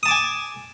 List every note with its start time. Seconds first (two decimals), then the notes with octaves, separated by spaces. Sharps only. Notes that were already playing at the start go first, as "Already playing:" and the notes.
0.03 D#6
0.06 A5
0.08 D6
0.11 G#5